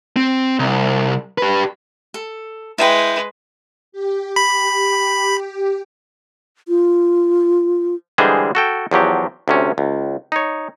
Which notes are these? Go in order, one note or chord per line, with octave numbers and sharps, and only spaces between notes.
C4
C2
G4 B4
A4
G#3 E4 A#4 B4 G5
G4
B5
F4
D3 E3 G3 G#3 G#4 C5
F#4 A4 G5
E2 F3 F#3 G4
D2 C3 C#4
C#2
D#4 C#5